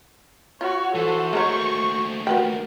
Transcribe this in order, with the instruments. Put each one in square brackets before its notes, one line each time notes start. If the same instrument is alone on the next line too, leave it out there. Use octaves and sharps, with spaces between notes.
[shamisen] F4 [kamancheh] F#4 C#5
[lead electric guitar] E3 [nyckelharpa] F#4 C5 [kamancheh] A4 F#5
[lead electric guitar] D#2 A3 [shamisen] G#3 A#4 C#5 [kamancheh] C#6
[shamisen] F#4 B4 G5 [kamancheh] A#4